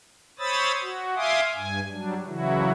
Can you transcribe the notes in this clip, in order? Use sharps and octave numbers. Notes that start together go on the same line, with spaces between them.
C5 C#5 B5 D#6 E6 A6
F#4
E5 F5 G#5 C6 D6 D#6
G2 G#5
F#3 G3 D4
C#3 E3 F#3 E4 F#4